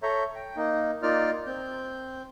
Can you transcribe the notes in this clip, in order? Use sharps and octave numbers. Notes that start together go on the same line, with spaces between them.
A4 C#5 E5 A#5 G6
G5
A#3 D#4
A#3 D#4 F4 D5 F6
C4 G6